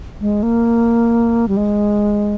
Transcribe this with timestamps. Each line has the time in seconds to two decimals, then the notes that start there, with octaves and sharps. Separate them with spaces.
0.21 G#3
0.43 A#3
1.48 G3
1.57 G#3